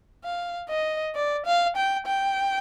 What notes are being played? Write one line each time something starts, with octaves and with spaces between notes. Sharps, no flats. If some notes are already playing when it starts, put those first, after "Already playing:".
F5
D#5
D5
F5
G5
G5